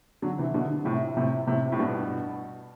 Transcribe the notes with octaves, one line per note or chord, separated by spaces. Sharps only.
D3 F#3
C3 E3
B2 D3
A2 C3
A2 C3
A2 C3
A2
G2 B2